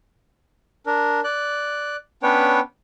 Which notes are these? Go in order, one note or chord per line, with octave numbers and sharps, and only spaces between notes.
D4 A#4
D5 F#6
B3 C#4 D4 B4 C#5 G5